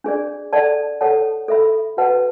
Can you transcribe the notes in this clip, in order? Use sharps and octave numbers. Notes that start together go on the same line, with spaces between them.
D4 G#4 D5
A4 D5 F#5 A5
A4 C#5 F#5 A5
A4 E5 B5
F#4 B4 F#5 A5